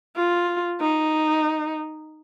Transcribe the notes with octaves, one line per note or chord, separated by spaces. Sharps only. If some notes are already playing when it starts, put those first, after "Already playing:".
F4
D#4